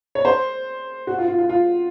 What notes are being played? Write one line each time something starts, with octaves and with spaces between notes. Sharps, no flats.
C#5
C5
F#4
F4
F4
F4
F4